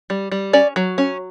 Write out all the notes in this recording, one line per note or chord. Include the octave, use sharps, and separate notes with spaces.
G3
G3
C#4 D5
F#3
C#4